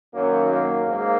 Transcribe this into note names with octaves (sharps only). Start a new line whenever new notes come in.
F#2 D#3 F#3 A#3
A#3
G#2 A#3